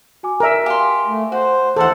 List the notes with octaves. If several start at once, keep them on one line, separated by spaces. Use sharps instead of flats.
F#4 G#5 D6
A#4 D5 E5 A#5
G4 F5 G#5 C6 D6
A3
F#4 C5
D#2 E3 A4 C5 D5 F#5